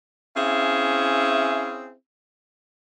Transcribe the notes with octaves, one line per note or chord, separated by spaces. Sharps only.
C4 C#4 E4 G#4 E5 F5